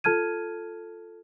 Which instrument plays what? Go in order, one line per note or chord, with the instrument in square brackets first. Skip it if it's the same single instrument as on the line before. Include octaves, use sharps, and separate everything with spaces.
[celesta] F4 A4 A5 F6 G#6 D#7